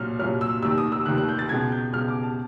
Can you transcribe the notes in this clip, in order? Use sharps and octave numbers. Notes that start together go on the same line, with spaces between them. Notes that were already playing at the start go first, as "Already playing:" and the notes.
Already playing: C2 A#2 F#3 F6
C2 A#2 F#3 F6
E6
F1 D#2 D#3 E6
D#6
E6
F1 D#2 D#3 F#6
F#6
G6
A6
C#2 B2 G#3 G#6
G6
C#2 B2 G#3 F6
D6
A5